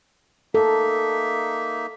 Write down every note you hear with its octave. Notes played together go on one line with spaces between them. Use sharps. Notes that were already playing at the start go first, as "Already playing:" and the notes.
A#3 D#4 A4 E5